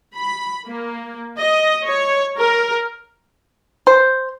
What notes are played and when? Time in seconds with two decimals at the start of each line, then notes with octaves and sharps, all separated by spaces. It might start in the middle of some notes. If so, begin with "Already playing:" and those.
0.15 B5
0.68 A#3
1.39 D#5
1.85 C#5
2.39 A#4
3.87 C5